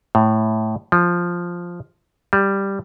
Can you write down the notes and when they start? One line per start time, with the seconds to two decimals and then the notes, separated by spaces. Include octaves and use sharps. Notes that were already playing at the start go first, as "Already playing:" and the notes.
0.15 A2
0.92 F3
2.33 G3